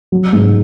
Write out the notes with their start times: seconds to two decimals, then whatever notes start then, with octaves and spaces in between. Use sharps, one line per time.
0.12 F#3
0.33 G#2